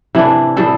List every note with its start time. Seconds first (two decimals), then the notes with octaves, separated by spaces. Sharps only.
0.15 C3 E3 A3 D4 E4
0.57 A2 G3 C4 A4